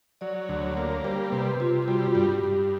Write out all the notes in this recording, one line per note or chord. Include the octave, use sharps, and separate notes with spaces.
F#3 D5
D2
C#5
A#3
G3 C5
C3 B4
C3 F4
F4
G3 F#4
G2
G4
G2